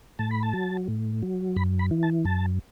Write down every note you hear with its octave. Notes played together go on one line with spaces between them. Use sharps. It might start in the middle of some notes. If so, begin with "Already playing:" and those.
A2 A5
B5
A5
F#3
A2
F#3
F#2 B5
B5
E3
A5
F#2 A5